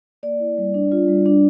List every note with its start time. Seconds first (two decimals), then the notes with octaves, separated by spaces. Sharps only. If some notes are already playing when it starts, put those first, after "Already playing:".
0.23 A#3 D5
0.40 E4
0.58 G3
0.74 D4
0.92 F4
1.08 G3
1.26 D4